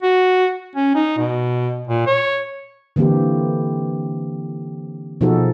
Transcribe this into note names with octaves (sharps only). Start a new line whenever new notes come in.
F#4
C#4
D#4
B2
A#2
C#5
D3 E3 A#3 C4 G4
B2 F3 D#4 F#4 G#4 A4